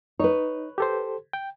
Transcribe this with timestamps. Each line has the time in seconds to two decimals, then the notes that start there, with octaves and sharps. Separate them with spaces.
0.20 D#4 B4 C#5
0.78 G4 A4 C5
1.33 G5